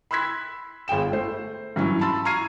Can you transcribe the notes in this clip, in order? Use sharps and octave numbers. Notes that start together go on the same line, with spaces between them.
B5 C6 E6 F#6 G#6 B6
G1 G#4 G5 E7
A3 C5
G2 E3 F#3 C#4
A5 B5 C6 E6 A6
A#5 C#6 F6 G#6 C7 D#7